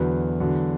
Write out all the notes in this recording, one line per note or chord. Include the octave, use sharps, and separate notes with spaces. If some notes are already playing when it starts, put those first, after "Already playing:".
Already playing: E2 D3 F#3 B4
E2 D3 F#3